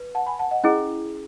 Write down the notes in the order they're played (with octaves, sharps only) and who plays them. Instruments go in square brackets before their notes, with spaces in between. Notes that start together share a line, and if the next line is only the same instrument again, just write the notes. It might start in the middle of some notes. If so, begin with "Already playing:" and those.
Already playing: [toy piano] B4
[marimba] F#5 A5
G#5 B5
F#5 A5
D#5 F#5
[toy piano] C#4 E4 G#4 [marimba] D#5 F#5